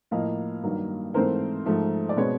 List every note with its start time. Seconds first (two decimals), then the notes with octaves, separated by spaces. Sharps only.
0.11 A2 F3 A#3 D#5 F5
0.63 G2 D#3 F#3 A#3
1.14 G#2 E3 A3 C4 A#4 C5
1.66 G#2 F3 A3
2.09 D5
2.16 B2 G#3 C4 B4 C#5